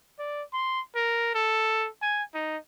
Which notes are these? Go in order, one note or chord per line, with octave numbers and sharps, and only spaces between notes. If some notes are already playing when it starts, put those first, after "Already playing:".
D5
C6
A#4
A4
G#5
D#4